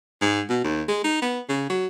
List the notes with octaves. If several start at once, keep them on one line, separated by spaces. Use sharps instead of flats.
G#2
B2
D#2
G#3
D#4
B3
C#3
F#3